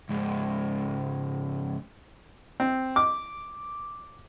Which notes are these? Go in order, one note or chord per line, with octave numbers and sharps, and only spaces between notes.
C#2 G#2
C4
D6